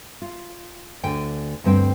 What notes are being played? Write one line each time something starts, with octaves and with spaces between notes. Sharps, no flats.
F4
D2 D3 G5 G#5
D2 G2 C4 G5